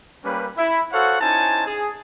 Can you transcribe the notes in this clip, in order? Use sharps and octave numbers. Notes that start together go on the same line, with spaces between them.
G3 A#3 C#4 G4 B4
E4
F#4 A4 C5 C#5 F5 F#5
C#4 D#4 E4 C5 G#5 A5
G#4